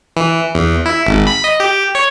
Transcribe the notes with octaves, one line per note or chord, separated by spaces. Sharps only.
E3
E2
E4
G#1
B5
D#5
G4
C#5